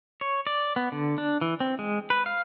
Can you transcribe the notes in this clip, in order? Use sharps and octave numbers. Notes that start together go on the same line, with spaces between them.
C#5
D5
B3
D3
D4
E3
C4
G#3
B4
F5